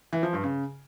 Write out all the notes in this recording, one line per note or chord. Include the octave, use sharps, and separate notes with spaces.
E3
F3
G2
C#3